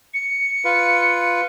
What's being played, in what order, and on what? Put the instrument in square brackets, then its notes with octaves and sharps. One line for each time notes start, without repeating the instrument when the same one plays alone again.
[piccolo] C#7
[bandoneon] F4 B4